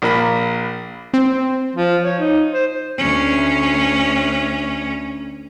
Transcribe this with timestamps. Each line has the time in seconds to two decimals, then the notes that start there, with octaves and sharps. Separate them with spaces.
0.02 A#1 A#3 B5
1.14 C4
1.76 F3
2.04 C#5
2.20 D#4
2.54 C5
2.98 D2 C#4